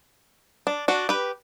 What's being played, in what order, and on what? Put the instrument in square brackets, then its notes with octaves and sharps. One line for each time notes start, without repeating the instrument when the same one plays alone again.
[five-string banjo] D4
D4 F#4
G4 B4